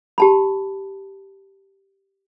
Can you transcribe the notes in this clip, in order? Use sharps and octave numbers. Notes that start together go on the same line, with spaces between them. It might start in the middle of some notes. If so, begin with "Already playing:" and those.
G4 A5 B5